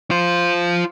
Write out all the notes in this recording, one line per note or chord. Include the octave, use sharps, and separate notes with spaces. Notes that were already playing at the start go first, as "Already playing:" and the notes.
F4 C5